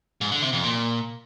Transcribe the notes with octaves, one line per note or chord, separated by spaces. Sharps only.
G#2
D3
C3
F2
A#2